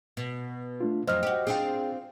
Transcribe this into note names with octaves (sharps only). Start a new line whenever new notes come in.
B2
A3 D4 F4
F2 F#3 C5 D#5 F6
F#4 G4
C4 D4 F4 G#4 G5